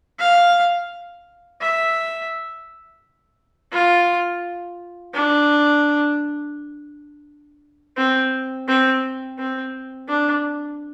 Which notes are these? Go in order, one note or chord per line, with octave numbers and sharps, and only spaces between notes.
F5
E5
F4
D4
C4
C4
C4
D4